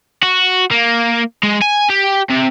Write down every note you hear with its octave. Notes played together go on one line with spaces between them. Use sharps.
F#4
A#3
G#3
G#5
G4
C3